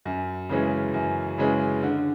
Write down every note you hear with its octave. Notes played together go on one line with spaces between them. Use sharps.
F#2
C#3 E3 G#3 C#4
F#2
C#3 E3 G#3 C#4
D3